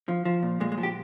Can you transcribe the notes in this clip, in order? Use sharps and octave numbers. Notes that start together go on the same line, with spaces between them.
F3
F3
A#2
A#2 G#3
G#3
F3
G4